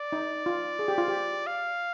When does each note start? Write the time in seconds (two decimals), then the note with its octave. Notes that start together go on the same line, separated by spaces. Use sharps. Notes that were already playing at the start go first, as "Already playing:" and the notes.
Already playing: D5
0.12 D#4
0.46 F4
0.79 G#4
0.88 G4
0.98 F4
1.08 G4
1.47 F5